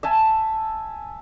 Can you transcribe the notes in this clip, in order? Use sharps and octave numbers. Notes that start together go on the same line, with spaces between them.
E5 G#5 A5